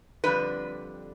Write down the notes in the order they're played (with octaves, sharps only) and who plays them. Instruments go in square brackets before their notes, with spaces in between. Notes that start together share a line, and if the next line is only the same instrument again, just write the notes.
[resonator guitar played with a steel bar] F2 D3 G3 D4 B4